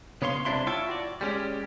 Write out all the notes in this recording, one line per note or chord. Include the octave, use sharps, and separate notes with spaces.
C#3 B3 C#5 F5 C6
C2 G2 C3 D4 E4 C6
E4 F4 C#5 E5 G5 A5
F#4 D5
G3 G#3 C#4 G4